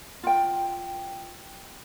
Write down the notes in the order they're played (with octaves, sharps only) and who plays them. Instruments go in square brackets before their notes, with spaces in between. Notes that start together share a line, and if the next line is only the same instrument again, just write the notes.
[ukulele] F4 G5